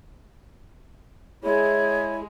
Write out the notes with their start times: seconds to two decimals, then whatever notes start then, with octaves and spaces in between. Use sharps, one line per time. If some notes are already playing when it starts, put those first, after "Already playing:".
1.44 G#3 E4 G#4 C#5